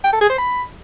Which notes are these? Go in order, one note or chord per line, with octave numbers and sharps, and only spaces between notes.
G5
A4
G#4
C5
B5